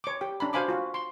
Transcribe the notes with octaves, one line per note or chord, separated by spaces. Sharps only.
C#5 D6
G4 G5
C#4 D4 A#5 B5
F#4 C5 F5 G#5 B5 D6
F4 F#4
C6